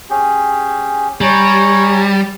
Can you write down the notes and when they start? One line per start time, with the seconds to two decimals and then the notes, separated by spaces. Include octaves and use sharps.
0.10 C#4 G4 G#4
1.21 G3 C#5 G#5 A#5